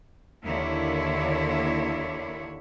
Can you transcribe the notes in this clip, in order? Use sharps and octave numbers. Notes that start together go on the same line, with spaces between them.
D#2 D3 A#3 E4 C#5